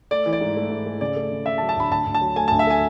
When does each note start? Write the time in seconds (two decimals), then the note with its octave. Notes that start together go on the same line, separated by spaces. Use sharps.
0.11 A3 D5
0.26 E3
0.33 D5
0.41 G#2
0.56 A3
0.70 G#2
0.86 A3
1.01 C#3 D5
1.16 A3
1.32 C#3
1.46 C#3 E5
1.58 A5
1.62 F#3
1.69 A5
1.76 D2 B5
1.91 D2 A5
2.06 D2
2.14 A5
2.21 F#3
2.36 A3 G#5
2.48 D2 A5
2.59 E5
2.67 A3 G#5